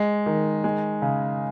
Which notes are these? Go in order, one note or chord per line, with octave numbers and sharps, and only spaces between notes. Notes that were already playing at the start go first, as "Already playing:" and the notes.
Already playing: G#3
D#3
G#3
C#3